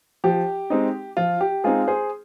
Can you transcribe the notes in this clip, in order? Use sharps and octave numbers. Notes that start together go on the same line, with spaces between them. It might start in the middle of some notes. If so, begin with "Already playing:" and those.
F3 G4
G#3 C4 D#4
F3 F4
G4
G#3 C4 D#4 F4 G#4
G#4 C5